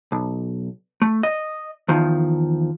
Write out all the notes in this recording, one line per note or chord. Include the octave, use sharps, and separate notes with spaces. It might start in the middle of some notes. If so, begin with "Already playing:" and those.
B1
A3
D#5
E2 D#3 F3